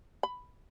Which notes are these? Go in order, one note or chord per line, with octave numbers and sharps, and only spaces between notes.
B5